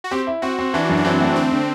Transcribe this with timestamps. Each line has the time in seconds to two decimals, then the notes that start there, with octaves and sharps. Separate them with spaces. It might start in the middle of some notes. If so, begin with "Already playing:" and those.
0.04 F#4
0.11 C4 G4
0.27 E4
0.42 C4 F#4
0.59 C4
0.74 E3 D4
0.89 F#2
0.97 D4
1.04 E3 C4
1.20 A3
1.36 D3 C4
1.52 D3